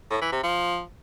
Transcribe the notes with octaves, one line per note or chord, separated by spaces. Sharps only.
A2
E3
C3
F3